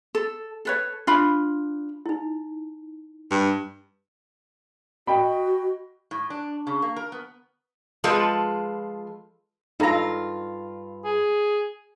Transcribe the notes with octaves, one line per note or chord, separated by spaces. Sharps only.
A4
A4 B4 C#5
D4 F4 B5
D#4 E4
G2
F#4 D#5 G5 B5
A2
D4
C#3
A#3
A#4
B3
F3 G#3 F4 A4 B4
G2 D#4 F4 A4 A#5
G#4